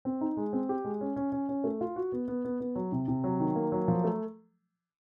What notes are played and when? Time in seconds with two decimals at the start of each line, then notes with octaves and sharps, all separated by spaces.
0.05 C4
0.21 D#4
0.37 G#3
0.53 C4
0.69 G4
0.85 G#3
1.01 C#4
1.16 C#4
1.32 C#4
1.49 C#4
1.64 A3
1.81 F4
1.96 F#4
2.12 B3
2.28 B3
2.45 B3
2.60 B3
2.76 F#3
2.92 C3
3.08 C3
3.24 F#3
3.40 D#3
3.56 A#3
3.72 F#3
3.88 F3
4.04 A3